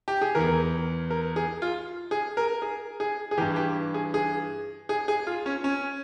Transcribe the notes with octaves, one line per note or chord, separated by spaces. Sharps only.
G4
G#4
E2 E3 A#4
A#4
G#4
F4
G#4
A#4
G#4
G#4
G#4
G2 E3 G4
G4
G#4
G#4
G#4
G#4
F4
C#4
C#4